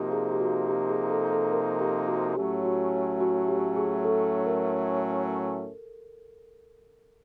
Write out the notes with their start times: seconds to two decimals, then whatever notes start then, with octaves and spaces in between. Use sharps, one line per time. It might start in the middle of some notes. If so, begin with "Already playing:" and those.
Already playing: C3 F3 A#3 D#4 F#4 G4
0.12 G#4
0.32 G4
0.40 F#4
0.69 G4
0.90 G#4
1.10 A4
1.32 A4
1.52 A#4
1.80 G4
2.08 F#4
2.36 A2 F#3 A3 C#4 G4
2.64 F#4
3.20 F#4
3.48 G4
3.76 G#4
4.04 A4
4.46 A#4